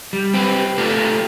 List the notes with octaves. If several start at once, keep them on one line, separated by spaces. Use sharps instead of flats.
G3
C4 G4 B4
A3 D4 F4 G4 A4 A#4